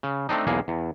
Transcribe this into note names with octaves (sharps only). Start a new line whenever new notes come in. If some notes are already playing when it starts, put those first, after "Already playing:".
C#3
A3 C4 D4 D#4
B1 E2 A#3 G#4
E2